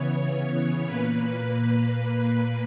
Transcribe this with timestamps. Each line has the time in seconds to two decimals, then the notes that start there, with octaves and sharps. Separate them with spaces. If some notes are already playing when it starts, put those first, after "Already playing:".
Already playing: C#3 E3 B3 C#5
0.85 A#2 A#3 B4